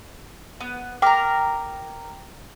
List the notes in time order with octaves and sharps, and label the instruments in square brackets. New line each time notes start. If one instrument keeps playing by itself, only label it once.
[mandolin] B3
[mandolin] A#4 A#5 [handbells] G5 D6